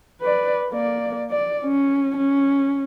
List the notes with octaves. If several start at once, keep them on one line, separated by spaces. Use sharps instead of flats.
B4 D5
A#3 D5
D5
C#4
C#4